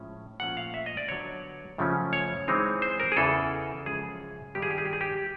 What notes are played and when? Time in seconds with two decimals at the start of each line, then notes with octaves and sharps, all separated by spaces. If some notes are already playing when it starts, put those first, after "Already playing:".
Already playing: A2 F3 G#3 C#4
0.40 A#2 F3 A3 C#4 F4 F#5
0.57 F5
0.74 E5
0.86 D#5
0.97 D5
1.09 D3 F#3 B3 C#5
1.78 F#2 C#3 F3 A3 C#4
2.13 C#5
2.48 E3 G#3 C4 D#4
2.82 C5
3.00 A#4
3.12 G#4
3.17 E2 C#3 E3 A4
3.86 F#2 C#3 F3 G#3 G#4
4.55 G2 D#3 G3 B3 D#4 G4
4.62 G#4
4.71 G4
4.78 G#4
4.85 G4
4.93 G#4
5.01 G4